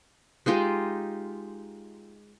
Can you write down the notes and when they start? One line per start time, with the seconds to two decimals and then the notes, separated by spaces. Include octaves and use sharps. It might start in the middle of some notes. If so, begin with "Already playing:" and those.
0.46 G#3 D#4 F4 G4